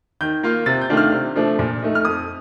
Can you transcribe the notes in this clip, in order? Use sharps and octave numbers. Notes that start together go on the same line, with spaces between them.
D#3 G6
A#3 F4
C3 A6
G6
D#3 A3 D4 F4
F6
C3
F3 A3 D4
A#2
A3 D#4
F6
F2 D#6